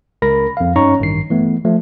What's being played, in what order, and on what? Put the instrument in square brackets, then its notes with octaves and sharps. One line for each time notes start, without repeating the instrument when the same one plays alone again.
[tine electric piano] C#2 A#4 B5 A#6
F2 F5
G2 C#4 D#4 C#5 A#5 C#6
A1 G2 D#3 C7
E3 A3 B3
F3 A3